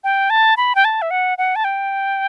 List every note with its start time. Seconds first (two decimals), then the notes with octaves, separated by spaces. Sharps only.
0.04 G5
0.30 A5
0.57 B5
0.75 G5
0.85 A5
1.02 E5
1.11 F#5
1.38 F#5
1.56 A5
1.64 G5